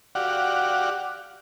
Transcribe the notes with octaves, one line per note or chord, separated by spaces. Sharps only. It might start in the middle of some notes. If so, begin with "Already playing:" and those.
F#4 G4 D5 F5 F#5